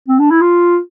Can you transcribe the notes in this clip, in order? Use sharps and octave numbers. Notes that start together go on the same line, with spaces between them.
C4
D4
E4
F4